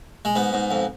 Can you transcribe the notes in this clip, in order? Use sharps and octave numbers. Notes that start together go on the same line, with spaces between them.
G#3
G#2 B3
G#2
F2